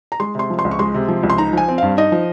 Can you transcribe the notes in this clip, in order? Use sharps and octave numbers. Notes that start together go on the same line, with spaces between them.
A#5
G#3 C6
C3 C6
F3
C6
C#2
C#6
G#3 C6
C3
F3
C#2
C6
D#4 A#5
F3 G#5
C4
G2 F5
D#4 D#5
F3